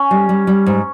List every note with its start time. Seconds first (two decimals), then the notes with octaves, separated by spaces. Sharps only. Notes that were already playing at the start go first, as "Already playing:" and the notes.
Already playing: C#4
0.11 G3
0.29 G3
0.47 G3
0.66 G#2